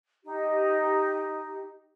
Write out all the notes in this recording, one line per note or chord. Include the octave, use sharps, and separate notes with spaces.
D#4 G4